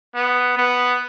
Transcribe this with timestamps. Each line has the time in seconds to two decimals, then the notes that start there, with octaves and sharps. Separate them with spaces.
0.15 B3
0.57 B3